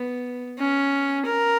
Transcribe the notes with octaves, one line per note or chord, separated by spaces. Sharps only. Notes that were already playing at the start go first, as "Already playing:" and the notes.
Already playing: B3
C#4
A#4